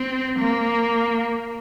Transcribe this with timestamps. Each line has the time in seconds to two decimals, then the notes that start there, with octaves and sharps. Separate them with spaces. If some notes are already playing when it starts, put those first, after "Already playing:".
Already playing: C4
0.39 A#3